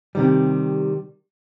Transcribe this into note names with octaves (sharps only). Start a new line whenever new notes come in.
C3 D#3 G3